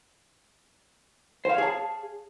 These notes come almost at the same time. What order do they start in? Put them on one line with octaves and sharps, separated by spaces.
C5 F5 C#5 G#4 A5